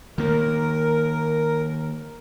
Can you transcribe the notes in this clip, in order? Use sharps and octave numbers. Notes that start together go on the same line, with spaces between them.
D#3 A#3 A#4